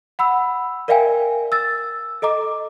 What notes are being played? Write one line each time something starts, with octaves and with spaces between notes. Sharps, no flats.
F#5 B5 E6
A#4 D5 E5 F5 G5 G#5
E6 A6
A4 D#5 A#5 D6